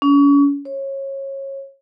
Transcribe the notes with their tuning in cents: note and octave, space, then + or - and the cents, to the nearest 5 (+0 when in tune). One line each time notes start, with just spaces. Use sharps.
C#4 +35
C#5 -25